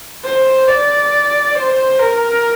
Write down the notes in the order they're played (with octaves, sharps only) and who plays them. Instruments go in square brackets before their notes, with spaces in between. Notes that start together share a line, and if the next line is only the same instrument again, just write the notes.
[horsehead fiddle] C5
D5
C5
A#4